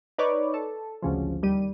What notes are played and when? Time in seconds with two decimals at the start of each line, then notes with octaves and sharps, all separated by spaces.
0.18 D#4 B4 C#5 D5
0.54 A4
1.02 G#1 D2 C#3 F3
1.43 D#2 G3 D#7